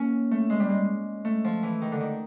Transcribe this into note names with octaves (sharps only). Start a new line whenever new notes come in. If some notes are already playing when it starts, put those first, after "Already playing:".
Already playing: A#3 C#4
A3
G#3
G3
G#3
A3
F3
E3
D#3
D3
D#3